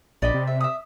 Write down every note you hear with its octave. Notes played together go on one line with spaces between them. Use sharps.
A#1 D5 D#5 B5
C3
E5
E5 D#6